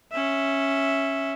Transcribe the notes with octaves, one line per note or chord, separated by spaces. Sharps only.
C#4 E5